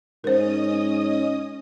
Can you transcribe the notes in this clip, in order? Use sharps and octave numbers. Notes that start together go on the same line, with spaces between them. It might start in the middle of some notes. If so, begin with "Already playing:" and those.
G#2 C#4 A#4 C5 D#5 D#6